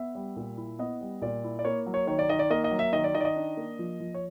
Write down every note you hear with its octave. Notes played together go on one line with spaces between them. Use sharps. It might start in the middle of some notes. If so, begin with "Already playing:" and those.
Already playing: B3 E5
G3
A#2
E4
B3 D#5
G3
A#2 D5
E4
D5
A#3 C#5
F#3
C#5
D#3 C#5
D5
D#3 D#5
D5
A#3 D#5
D#5
F#3
E5
D#3 D#5
D5
D#3 D#5
D5
D#5
D4
A#3
F3
F3
C#5